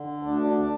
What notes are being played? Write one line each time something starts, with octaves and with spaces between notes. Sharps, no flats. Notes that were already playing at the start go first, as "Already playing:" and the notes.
Already playing: D3
D2 D4
D4